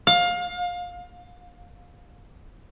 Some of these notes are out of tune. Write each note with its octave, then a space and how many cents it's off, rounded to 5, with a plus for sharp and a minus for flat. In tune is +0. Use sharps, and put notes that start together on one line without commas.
F5 +25